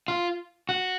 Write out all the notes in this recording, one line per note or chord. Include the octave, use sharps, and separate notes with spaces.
F4
F#4